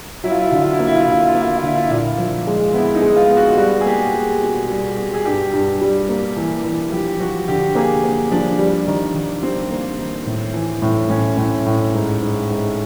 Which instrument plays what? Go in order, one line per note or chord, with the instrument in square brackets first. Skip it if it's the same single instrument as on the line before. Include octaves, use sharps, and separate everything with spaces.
[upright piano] F#3 [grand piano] E4
[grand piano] F4
E4
F4
[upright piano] D3 [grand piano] E4
[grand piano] F4
E4
[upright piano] A#3 [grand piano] F4
[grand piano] E4
F4
E4
[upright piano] D3 [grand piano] F4
[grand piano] E4
F4
[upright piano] A#3 [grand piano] E4
[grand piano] F4
E4
F4
[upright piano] D3 [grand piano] E4
[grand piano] F4
E4
[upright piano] A#2 [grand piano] F4
[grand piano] E4
[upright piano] F3
G#3
[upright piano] B3 [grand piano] E4
[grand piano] D#4
[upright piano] G#3
[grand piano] F4
[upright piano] B3
[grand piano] F#4
[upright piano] G3 [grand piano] F#4
[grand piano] G#4
[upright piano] A#3 [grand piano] G4
[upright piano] G3
B2
G3
B2
[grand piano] G#4
[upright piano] G2 [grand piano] G4
[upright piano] G2
G3
A#3
E3
E3
[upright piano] F3 [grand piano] G4
[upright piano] F3 [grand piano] F#4
[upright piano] D3 [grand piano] G4
[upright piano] A#3 [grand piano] G#4
[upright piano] A#3
[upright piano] F3 [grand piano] D4
[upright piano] G3
D#3
D#3
[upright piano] G3 [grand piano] C4
[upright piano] A#3
D#3
A2
E3
A2
[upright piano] A2 [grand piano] C#4
[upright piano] A2
A2
G#2
G#2
G#2